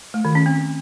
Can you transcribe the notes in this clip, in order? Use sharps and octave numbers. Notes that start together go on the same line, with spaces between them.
A3
D#3
C#4
C4